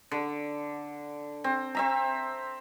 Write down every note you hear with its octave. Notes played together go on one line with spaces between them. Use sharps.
D3
C4
C4 E5 A#5